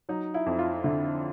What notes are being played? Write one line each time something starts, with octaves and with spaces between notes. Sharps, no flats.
F#3 D#4
E4
F2
F4
D3 E4